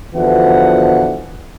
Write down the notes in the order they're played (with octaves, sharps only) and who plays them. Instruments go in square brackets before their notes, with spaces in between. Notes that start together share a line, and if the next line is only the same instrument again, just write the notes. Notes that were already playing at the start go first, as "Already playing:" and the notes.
[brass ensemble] E2 B2 D3 E3 F3 F#5